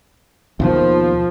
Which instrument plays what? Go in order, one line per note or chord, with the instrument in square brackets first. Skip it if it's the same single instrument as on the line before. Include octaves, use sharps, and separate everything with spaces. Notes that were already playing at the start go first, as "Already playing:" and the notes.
[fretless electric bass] D#2 B2 D#3 [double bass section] F3